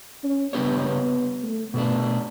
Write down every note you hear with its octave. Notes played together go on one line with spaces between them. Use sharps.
C#4
C#3 G3 B3 D4 G4 C#5
B3
A3
B2 A3 B3 D4